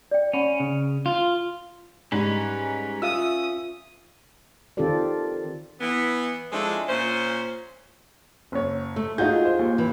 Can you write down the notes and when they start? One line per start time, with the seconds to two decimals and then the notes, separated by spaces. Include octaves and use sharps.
0.11 D5 G5
0.33 C#4 E5 F#5 B5
0.60 C#3
1.06 F4
2.12 G#2 G3 C#4 B4
3.02 F4 E5 F5 D#6 E6
4.77 D#3 C4 F4 G4 A4 D5
5.80 E3 B3
6.52 F3 G#3 A3 C4 D4 E4
6.88 A#2 C#4 C5
8.52 F#1 C#5
8.96 A3
9.18 D#4 F4 F#4 G#4 G6
9.45 C5
9.59 D#2
9.78 E3